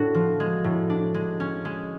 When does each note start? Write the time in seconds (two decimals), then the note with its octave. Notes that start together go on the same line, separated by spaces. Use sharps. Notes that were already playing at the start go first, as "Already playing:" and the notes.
Already playing: A2 B3 D4 F#4 A4
0.14 F3
0.40 G#3
0.64 A2
0.90 D4
1.14 G#3
1.40 C#4
1.65 G#3